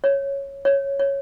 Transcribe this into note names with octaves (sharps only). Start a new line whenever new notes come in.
C#5
C#5
C#5